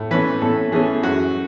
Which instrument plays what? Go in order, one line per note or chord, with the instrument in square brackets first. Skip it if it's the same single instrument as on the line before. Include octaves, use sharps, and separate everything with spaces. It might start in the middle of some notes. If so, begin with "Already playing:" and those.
Already playing: [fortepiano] A2
E3 A3 C#4 B4
A2 A4
E3 A3 C#4 G#4
F#2 F#4